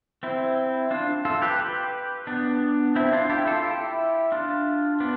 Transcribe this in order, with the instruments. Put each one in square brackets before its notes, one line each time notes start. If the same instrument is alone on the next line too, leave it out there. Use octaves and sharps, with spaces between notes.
[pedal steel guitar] C4 E4
D4 F4
F4 A4
G4 B4
G4 B4
B3 D4
C4 E4
D4 F4
E4 G4
F4 A4
E4 G4
D4 F4
B3 D4